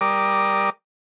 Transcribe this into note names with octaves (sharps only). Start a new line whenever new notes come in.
G3 A#4 D5 D6 D#6